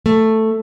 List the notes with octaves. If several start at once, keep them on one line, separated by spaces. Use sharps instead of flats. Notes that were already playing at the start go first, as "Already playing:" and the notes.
A3